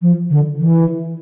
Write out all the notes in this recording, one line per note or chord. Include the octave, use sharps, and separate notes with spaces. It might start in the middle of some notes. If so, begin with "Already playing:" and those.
F3
D3
E3